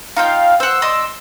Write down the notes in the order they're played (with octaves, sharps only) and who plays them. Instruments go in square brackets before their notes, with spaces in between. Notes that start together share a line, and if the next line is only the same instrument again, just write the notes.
[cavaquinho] D#4 F4 G5 [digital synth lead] F5
[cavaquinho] C5 F#5 [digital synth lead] E6
[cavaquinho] D5 D#5 C6